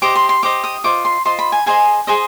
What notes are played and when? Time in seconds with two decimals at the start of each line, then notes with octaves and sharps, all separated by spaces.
0.02 G4 C5 D#5 D6
0.15 C6
0.29 C6
0.43 G4 C5 D#5 D6
0.64 D#6
0.84 F4 C5 D#5 D6
1.05 C6
1.25 F4 C5 D#5 C6
1.39 B5
1.52 G#5
1.66 G#4 C5 D#5 G#5
2.07 G#4 C5 D#5